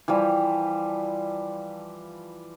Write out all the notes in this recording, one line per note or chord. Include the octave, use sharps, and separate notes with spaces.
E3 F3 G3 E4